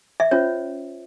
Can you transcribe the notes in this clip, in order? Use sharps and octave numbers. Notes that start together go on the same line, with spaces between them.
E5
C#4 F4 C5 C#5